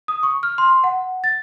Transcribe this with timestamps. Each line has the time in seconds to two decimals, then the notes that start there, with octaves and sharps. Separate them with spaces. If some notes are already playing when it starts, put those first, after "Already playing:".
0.08 D#6
0.23 C#6
0.43 F6
0.58 C6
0.84 F#5
1.24 A6